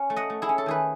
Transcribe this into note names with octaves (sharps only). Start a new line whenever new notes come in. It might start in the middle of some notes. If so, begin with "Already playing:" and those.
Already playing: C#4
A3
D#5 F#5
A3
E4 G#4
C#4
A4
D#3 G#4 B4